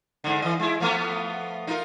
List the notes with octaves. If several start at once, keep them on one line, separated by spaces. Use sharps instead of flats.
G#2 D3
E3 D#5
G#3 E4
F3 A3 B3
D#4 F4 A#4